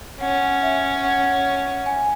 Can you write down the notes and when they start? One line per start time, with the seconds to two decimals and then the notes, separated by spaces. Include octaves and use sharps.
0.20 C#4 F#5
0.62 E5
1.04 F#5
1.86 G#5